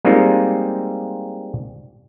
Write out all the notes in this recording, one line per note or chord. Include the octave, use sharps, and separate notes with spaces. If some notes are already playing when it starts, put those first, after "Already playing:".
G3 G#3 A#3 C4 D#4 F4